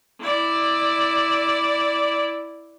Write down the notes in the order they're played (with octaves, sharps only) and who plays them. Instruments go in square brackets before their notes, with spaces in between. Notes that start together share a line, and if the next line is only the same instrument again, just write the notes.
[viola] E4 D5